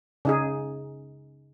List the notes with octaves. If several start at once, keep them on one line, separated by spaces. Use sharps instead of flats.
C#3 D#4 G#4